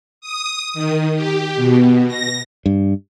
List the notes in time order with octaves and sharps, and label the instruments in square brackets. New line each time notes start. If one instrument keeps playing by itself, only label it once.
[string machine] D#6
D#3
G4
B2
A#6
[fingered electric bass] G2